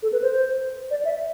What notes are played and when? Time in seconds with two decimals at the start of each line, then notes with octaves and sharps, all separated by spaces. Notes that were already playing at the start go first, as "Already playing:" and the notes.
0.03 A4
0.12 B4
0.22 C5
0.91 D5
1.05 E5